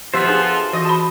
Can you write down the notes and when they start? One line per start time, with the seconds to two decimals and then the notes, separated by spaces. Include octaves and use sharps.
0.14 F3 B3 G4 C5 E5 C6
0.26 D4 D#4 F4 G#4 A4 C5
0.53 E5
0.73 E3 F#4 D#5
0.85 A5 B5